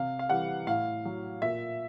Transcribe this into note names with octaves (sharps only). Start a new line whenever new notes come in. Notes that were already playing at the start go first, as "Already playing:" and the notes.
Already playing: C3 F5
F5
E3 G3 F#5
A2 F5
F#3
A#2 E5